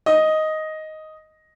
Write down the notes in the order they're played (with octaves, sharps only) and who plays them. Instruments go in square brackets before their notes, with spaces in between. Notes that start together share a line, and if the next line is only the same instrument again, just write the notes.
[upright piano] D#5